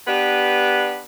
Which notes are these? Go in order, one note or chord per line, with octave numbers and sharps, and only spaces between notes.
B3 D4 G4 B4